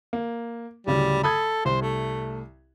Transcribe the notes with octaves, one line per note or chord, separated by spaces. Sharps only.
A#3
D1 C#3 G3
A4 B5 D#6 G#6
C2 C5
A3